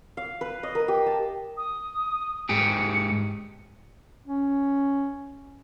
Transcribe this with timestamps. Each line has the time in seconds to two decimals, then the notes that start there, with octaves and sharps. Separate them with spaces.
0.17 F5
0.41 B4
0.63 D#5
0.75 A#4
0.88 G4
1.06 A5
1.57 D#6
2.49 G#2 G4 G#4 C#7
4.26 C#4